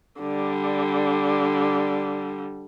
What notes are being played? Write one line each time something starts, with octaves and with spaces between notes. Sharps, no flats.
D3 G3